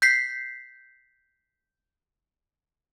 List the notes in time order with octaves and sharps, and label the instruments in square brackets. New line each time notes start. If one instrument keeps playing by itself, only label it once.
[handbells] G6 B6 C7